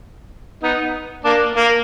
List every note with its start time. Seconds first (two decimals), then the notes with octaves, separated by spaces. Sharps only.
0.63 B3 D#4
1.25 A#3 D4
1.55 A#3